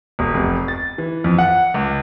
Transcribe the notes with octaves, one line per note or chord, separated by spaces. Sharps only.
E1
F1
A6
E3
F2
F#5
C#2